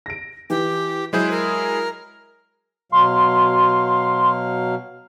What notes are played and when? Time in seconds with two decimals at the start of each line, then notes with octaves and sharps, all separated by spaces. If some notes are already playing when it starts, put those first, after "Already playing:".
0.06 A#6 D7
0.50 E3 G4
1.13 F#3 G#3 E4 G#4 C5
1.31 A#4
2.92 B2 F#3 F5 C6